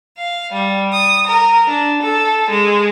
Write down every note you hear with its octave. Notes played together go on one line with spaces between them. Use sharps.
F5
G3
D#6
A#4
D4
A4
G#3